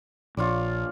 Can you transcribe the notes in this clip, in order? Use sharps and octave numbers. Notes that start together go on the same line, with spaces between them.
A#1 F4 C#5 D5